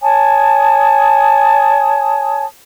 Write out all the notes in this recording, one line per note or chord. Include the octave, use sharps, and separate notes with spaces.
C#5 G#5 A5 D#6